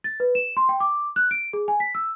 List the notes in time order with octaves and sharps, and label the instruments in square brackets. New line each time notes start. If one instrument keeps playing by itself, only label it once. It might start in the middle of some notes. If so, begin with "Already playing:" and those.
[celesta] A6
B4
E7
C6
G5
D6
F#6
D7
G#4
G#5
B6
E6